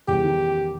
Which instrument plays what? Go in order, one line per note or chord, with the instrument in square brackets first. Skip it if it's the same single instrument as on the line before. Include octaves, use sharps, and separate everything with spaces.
[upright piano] E2 [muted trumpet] G4
[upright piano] D#3